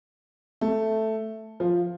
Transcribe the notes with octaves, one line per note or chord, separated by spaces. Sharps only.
A3
F3